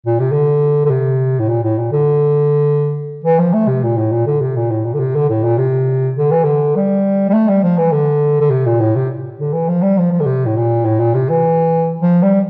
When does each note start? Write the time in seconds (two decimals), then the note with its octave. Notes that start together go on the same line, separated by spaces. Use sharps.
0.07 A#2
0.20 C3
0.32 D3
0.85 D3
0.91 C3
1.39 A2
1.49 A#2
1.64 A2
1.79 A#2
1.92 D3
3.24 E3
3.39 F3
3.54 A3
3.68 C3
3.83 A#2
3.97 A2
4.12 A#2
4.26 D3
4.41 C3
4.56 A#2
4.71 A2
4.85 A#2
4.94 D3
5.00 C3
5.15 D3
5.30 A2
5.44 A#2
5.58 C3
6.17 D3
6.31 E3
6.44 D3
6.76 G3
7.30 G3
7.34 A3
7.49 G3
7.64 F3
7.78 E3
7.92 D3
8.41 D3
8.51 C3
8.66 A#2
8.80 A2
8.96 C3
9.40 D3
9.53 E3
9.68 F3
9.82 G3
9.98 F3
10.12 F3
10.20 D3
10.26 C3
10.46 A2
10.57 A#2
10.85 A2
11.00 A#2
11.14 C3
11.30 E3
12.02 F3
12.23 G3